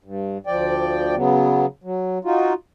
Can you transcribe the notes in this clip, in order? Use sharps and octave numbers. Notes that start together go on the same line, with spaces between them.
G2
D2 F3 D5 G5
C#3 F#3 B3
F#3
D#4 F4 F#4